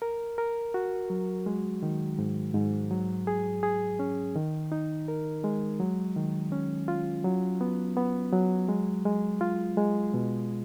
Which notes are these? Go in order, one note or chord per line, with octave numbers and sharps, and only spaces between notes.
A#4
A#4
F#4
F#3
G#3
D#3
G#2
G#2
F#3
G#4
G#4
C#4
D#3
D#4
A#4
G#3
F#3
D#3
C#4
F4
F#3
B3
B3
F#3
G#3
G#3
F4
G#3
B2